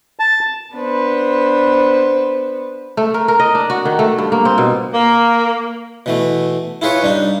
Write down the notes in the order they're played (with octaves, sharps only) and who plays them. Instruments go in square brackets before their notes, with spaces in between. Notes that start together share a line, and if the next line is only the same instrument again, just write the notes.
[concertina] A5
[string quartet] B3 D4 B4 C5
[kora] A3
A#4
A#4
D#5
D4
F#4
D#3
A3
G2
A#3
C4
B2
[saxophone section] A#3
[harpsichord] B2 E3 A3
E4 F4 G#4 B4 C#5
G2 D4 D#4